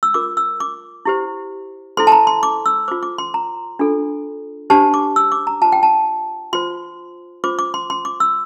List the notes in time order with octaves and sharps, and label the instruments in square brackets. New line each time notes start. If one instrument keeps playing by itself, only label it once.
[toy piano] E6
F4 A#4 D6
E6
D6
E4 G4 C5
E4 A4 C5 C6
A5
A#5
C6
D6
E6
F4 C5 D6
D6
C6
A#5
D4 F4 A4
D4 G4 C5 A5
D6
E6
D6
A#5
F4 C5 A5
G5
A5
F4 C5 C6
F4 C5 D6
D6
C6
C6
D6
E6